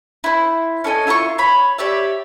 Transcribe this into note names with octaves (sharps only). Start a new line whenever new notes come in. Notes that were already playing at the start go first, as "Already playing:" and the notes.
E4 C5
C#4 A4 D#5 G#5
E4 F4 A#5 C#6
C#5 B5
G4 C#5 D5 E5